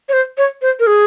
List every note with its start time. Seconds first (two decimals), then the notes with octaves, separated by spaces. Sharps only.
0.09 C#5
0.13 C5
0.38 C#5
0.62 C5
0.80 A#4
0.87 G#4